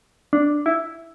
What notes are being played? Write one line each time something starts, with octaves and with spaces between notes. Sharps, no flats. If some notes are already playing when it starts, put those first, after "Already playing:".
D4
E4